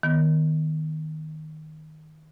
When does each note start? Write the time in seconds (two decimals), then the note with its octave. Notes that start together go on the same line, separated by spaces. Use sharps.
0.03 D#3 B3